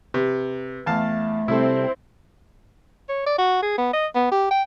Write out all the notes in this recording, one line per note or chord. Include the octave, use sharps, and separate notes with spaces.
C3 B4
E2 A3 F5 A5
C3 G3 C4 E4 A4
C#5
D5
F#4
G#4
B3
D#5
B3
G4
G5